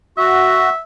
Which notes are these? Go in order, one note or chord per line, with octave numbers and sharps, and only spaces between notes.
F#4 E5